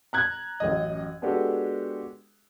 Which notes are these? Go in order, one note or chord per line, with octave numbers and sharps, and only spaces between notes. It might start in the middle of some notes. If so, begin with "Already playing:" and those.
A#5 F#6 G#6
A1 F#2 D#5
G#3 B3 D4 F#4 G4 A4